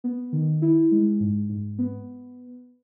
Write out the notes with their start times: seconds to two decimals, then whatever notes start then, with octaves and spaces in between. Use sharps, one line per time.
0.04 B3
0.32 D#3
0.62 E4
0.91 G#3
1.20 G#2
1.49 G#2
1.78 B3